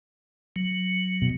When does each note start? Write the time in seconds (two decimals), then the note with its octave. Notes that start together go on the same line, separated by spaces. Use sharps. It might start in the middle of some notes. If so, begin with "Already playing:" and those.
0.56 F#3
1.22 B2